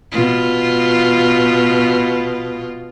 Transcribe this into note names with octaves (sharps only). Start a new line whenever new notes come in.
B2 F4